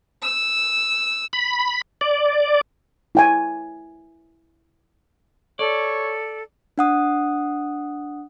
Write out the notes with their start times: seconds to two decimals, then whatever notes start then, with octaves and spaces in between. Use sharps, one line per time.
0.22 E6
1.33 B5
2.01 D5
3.15 E4 G5 G#5
5.59 A4 C#5 D5
6.78 D4 F#5 D#6